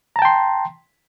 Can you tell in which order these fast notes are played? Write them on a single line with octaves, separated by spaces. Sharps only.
A#5 A5 G5 C6